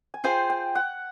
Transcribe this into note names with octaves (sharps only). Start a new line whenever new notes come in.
G#5
F4 G#4 C5 G5
G5
F#5